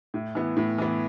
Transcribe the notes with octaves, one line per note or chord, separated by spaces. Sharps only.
A2
E3 B3
A2
E3 B3